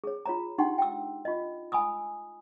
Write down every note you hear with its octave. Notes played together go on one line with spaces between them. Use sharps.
G#4 C#5
F4 C#5 A#5
D4 D#4 G4 F#5 G5 C6
G5 E6
F4 D#5
G#5 B5 D#6 E6